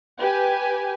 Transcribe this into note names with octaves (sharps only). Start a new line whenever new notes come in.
G4 B4 G#5